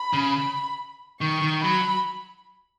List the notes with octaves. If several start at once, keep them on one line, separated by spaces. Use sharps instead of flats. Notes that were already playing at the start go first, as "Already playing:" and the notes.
Already playing: B5
C#3
D#3 C#6
D#3
F#3 B5